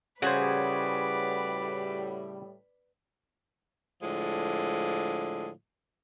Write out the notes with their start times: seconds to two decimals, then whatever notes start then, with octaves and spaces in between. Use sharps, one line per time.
0.22 A2 C#3 G3 F#4 G#4 B4 C5 D5
4.02 A2 D3 F3 G#3